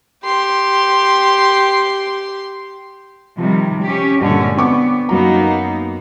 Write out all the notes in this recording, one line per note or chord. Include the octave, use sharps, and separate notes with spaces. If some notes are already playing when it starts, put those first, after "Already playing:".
G4 C6
C3 D#3 F3 G3
C#4 G4
G2 A#2 D3 G#3 C#4
B3 C4 C#6 D6
F#2 F#3 A#3 B3 D#4 A#5